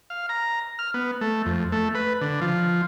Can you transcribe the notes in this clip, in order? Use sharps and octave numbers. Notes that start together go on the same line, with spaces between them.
F5
A#5
F6
B3
A3
F2
A3
B4
D3
F3